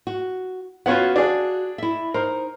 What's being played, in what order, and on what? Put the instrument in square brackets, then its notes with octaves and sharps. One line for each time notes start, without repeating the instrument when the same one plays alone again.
[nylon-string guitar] F#4
[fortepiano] B3 C#4 F4 [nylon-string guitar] F#4 F5 F#5
[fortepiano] D4 G#4
[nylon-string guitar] E4 E5
[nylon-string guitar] D#4 C5 [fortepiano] A#4